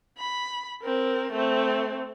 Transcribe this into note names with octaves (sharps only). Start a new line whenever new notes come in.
B5
C4 A#4
A3 C4